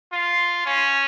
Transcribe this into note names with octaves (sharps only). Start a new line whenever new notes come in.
F4
C#4